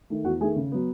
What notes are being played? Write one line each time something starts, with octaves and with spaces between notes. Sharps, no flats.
D#3 A3
E2 F#4 F#5
D#3 A3 G#4 G#5
C#3
F#3 B3